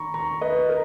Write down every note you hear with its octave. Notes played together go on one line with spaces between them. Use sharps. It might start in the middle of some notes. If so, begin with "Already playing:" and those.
Already playing: D#2 A#5 B5 C#6
A#5 C#6
B4 D#5
A#4